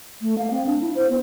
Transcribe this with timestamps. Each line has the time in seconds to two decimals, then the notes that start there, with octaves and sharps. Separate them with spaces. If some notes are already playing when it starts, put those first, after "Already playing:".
0.22 A3
0.38 F5
0.51 C4
0.66 D4
0.81 E4
0.95 C5
1.09 B3